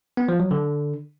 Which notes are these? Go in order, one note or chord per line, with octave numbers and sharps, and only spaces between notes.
B3
F3
F#3
D3